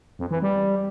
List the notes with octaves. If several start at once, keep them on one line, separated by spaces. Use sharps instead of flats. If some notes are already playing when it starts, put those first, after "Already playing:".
F2
E3
G3